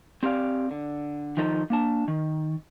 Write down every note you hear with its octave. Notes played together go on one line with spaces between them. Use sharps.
C4 G4 D5 F5
D3
D#3 F3 D#4 A4
A#3 D4 A5
D#3